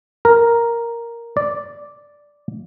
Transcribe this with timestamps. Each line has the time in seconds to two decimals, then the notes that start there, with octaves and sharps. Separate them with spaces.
0.25 A#4
1.37 D5